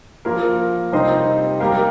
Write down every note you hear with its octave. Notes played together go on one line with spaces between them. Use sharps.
F3 A#3 F4 A#4
C3 G3 D#4 C5 D#5
G3 A#3 G4 A#4 F5